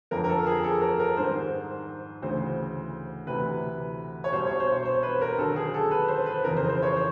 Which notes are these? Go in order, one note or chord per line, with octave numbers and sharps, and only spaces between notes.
F2 D3 F3 A#4
A#4
A4
G#4
A4
A#4
A#4
G#2 D#3 G3 C5
D2 C#3 E3 C5
D2 C3 E3 B4
C#5
C2 B2 G3 C5
C#5
C5
C#5
C5
B4
A#4
D#2 D3 F#3 A4
G#4
A4
B4
C5
B4
F2 C#3 E3 A#4
C5
C5
C#5
C5